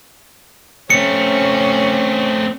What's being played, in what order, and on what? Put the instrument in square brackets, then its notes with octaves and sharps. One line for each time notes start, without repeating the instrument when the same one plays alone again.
[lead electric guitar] A3 C4 [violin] C#4 [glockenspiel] C#7